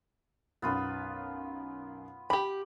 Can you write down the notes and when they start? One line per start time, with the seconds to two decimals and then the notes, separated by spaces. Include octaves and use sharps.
0.62 B1 F#2 B3 F4 B4
2.30 G4 B5 D6 F#7